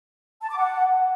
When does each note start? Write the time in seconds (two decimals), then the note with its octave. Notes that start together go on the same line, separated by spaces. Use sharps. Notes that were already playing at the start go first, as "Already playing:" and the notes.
0.41 A5
0.50 D6
0.59 F#5